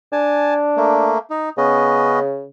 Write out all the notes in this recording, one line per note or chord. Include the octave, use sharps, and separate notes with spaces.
D4 G#5 A5
A3 A#3
D#4
C#3 B3 C#4 D#5